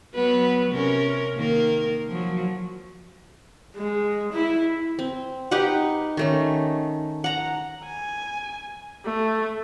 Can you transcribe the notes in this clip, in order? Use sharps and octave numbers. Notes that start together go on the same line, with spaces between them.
F#3 B3 B4
C3 C#4 A#4
D#3 A#3 A#4
F3 F#3
G#3
E4
C4
D#4 G4 B4 F#5
D#3 A3 C#4
F#5 A#5
G#5
A3